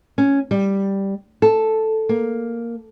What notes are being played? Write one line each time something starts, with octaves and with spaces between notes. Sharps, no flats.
C#4
G3
A4
A#3